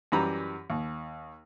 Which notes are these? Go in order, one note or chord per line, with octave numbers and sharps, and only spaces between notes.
F#2 E3 G3 A#5 B5
D#2